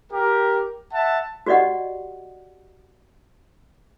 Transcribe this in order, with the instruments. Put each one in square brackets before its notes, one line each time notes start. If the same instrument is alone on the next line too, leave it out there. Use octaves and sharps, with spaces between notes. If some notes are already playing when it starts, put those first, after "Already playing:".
[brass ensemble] G4 A#4
E5 F#5 A5
[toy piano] F#4 G4 D5 D#5 F#5